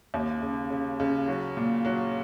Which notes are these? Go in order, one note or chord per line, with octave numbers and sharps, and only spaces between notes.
D#2
C#3
C#3
C#3
F#3
A#2
F#3